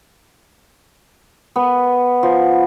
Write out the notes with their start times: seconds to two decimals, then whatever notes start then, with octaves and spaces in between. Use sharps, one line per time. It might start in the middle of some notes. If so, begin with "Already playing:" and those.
1.56 B3
2.23 F3